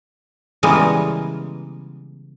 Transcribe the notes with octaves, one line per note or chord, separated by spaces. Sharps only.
C#3 E3 G3 G#3 A#3 B3